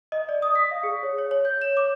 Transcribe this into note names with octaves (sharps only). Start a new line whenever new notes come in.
D#5
D5
D#6
B6
F5
G#4
C#5
C#5
C#5
G6
E7
D6